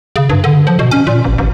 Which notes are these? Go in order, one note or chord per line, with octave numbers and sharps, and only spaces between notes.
C#3
G2
D3
F3
B2
C#4
A#2
A1
A1